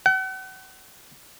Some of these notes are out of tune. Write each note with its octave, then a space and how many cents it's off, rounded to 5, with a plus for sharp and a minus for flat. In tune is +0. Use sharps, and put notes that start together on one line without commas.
F#5 +40